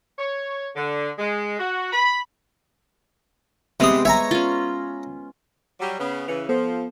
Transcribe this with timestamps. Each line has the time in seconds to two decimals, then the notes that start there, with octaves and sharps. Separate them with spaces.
0.19 C#5
0.75 D3
1.18 G#3
1.59 F#4
1.93 B5
3.80 C3 G#3 B3 C4 D#6
4.05 C#5 E5 G#5 A#5
4.31 C#4 F4
5.80 F#3 G3
5.98 C#3 B3
6.28 C#3 E3 B4 C#7 F7
6.49 F3 B3 A4 C5